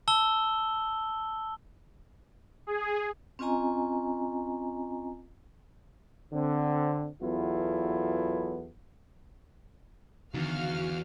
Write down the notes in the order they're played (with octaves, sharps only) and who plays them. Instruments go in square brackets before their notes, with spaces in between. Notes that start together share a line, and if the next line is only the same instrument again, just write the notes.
[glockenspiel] A5 E6 G7
[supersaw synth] G#4
[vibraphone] C4 C#4 F4 D#5 G#5 A#5
[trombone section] D3 C4
E2 F#3 B3 E4 F4 A4
[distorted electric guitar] E2 [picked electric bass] D3 D#3 [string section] F#4 F5 F6